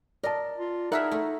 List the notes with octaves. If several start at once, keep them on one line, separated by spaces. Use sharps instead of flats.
A#4 D5 D#5 A5
F4
D#4 E4 G#4 A#4 E5 F#5
A3